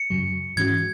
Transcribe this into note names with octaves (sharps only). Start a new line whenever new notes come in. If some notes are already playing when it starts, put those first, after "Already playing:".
Already playing: C#7
F#2 C#3 F#3
G#2 E3 G#3 C#4 F#4 G#6